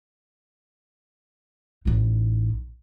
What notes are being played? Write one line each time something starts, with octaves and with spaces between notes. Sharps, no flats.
A1 D#4